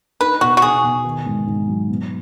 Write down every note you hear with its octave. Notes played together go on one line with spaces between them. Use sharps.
D#4 B4
B2 F#4
F#4
B2 G#4
B2
D#3
G#2
G#2
F#3
B2